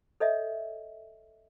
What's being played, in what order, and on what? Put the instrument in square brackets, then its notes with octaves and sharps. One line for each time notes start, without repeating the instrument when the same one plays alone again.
[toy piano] A4 C#5 D#5 E5